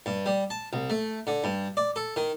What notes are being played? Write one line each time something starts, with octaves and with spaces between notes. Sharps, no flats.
G2
G3
A5
C2
A3
D3
G2
D5
A4
D#3